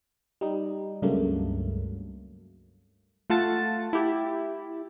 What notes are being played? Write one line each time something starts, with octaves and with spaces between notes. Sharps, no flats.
G3 D#4
C#2 G2 C#3 F#3 A3 A#3
A3 F4 F#5 A5 A6
E4 G4